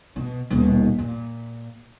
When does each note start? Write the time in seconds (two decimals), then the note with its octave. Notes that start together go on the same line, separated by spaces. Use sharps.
0.16 B2
0.50 D#1 B2
0.98 A#2